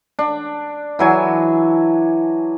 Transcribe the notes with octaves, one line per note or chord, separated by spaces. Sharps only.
D4
E3 F#3 G#5